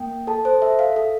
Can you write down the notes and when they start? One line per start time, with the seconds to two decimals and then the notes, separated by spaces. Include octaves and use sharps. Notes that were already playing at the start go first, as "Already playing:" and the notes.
Already playing: A#3 G5
0.27 A4 A5
0.45 C5
0.62 A4 E5
0.79 F5
0.96 A4